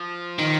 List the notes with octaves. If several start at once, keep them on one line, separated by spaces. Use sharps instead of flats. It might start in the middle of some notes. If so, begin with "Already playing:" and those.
Already playing: F3
D#3